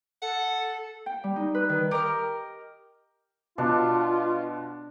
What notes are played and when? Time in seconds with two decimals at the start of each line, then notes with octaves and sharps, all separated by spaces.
0.22 A4 F#5
1.06 G5
1.24 G3
1.36 D#4
1.55 B4
1.69 D#3
1.91 G4 A#4 D#5 F6
3.58 B2 D4 F4